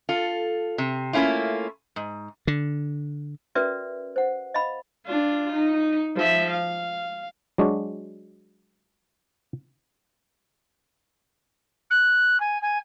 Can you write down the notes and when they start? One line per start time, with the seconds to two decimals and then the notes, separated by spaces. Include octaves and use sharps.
0.09 F4 A4
0.78 C3
1.13 A3 A#3 C#4 E4 F4
1.96 G#2
2.47 D3
3.55 C#4 F#4 A#4 B4 D5 E5
4.16 C5 F#5
4.54 D#5 F5 B5
5.07 D4 F4
5.53 D#4
6.16 F3 E5
6.51 F5
7.58 F#3 G#3 D4 F#4
11.90 F#6
12.40 G#5
12.62 G#5